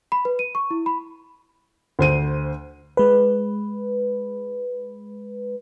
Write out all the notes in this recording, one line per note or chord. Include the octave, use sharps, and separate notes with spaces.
B5
B4
D#7
C#6
E4
B5
D2 C5 D#7
G#3 B4